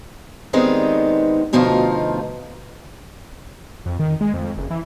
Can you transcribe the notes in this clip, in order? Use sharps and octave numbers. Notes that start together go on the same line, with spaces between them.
D#3 G3 G#3 B3 C4 D#4
D2 B2 F3 A3 D#4 F4
F2
D#3
G#3
F2
F#1
E3